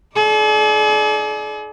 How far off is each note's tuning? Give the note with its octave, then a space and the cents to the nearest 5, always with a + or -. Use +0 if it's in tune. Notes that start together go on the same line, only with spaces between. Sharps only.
D#4 +30 G#4 +45 D5 +0